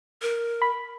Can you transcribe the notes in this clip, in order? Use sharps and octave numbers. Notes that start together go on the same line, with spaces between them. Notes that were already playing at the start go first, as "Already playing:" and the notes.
A#4
B5